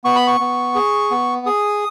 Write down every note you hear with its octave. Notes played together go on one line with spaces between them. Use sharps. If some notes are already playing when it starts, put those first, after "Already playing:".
B3 C#6
B5
C#6
B3
G#4
B3
G#4 D#6